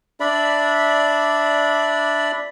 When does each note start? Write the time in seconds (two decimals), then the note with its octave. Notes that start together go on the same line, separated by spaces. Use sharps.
0.20 D4 D5 E5 B5